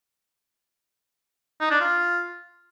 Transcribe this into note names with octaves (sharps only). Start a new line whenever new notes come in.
D#4
D4
F4